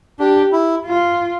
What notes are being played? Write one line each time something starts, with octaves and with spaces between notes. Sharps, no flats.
D4 G4
E4
F4